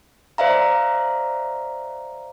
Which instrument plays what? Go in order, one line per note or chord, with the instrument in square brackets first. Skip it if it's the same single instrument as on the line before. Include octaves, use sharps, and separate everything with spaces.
[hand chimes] C5 D5 E5 F5 A#5